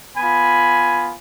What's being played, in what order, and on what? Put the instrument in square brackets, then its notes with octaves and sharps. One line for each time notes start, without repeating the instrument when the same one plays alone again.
[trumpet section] B3 F4 G#5 B5